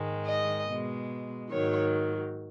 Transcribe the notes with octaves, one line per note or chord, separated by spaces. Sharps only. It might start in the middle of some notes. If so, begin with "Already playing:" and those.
Already playing: G#2 D#3 G#3
D#5
B2 G#3
G#2 D#3 F#3 C#5